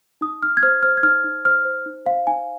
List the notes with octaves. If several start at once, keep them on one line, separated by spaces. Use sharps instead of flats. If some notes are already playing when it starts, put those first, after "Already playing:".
D#4 D#6
D#4 F6
G#6
C5 F6
C5 F6
G#6
D#4 F6
D#4
C5 F6
C5
D#4
C5 F5
D#4 G#5